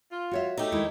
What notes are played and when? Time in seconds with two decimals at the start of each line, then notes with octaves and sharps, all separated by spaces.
0.12 F4
0.31 F#4 C#5 E5
0.58 A3 D#4 G4
0.72 D#2 G#3 E4